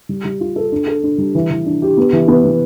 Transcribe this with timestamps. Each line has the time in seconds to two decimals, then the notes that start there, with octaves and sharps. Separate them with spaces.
0.09 G3
0.25 G3
0.40 F4
0.56 A4
0.72 D4
0.87 A4
1.03 D4
1.18 G3
1.35 E3
1.50 E3
1.66 D4
1.82 G4
1.97 B3
2.13 E3
2.28 B3
2.45 B3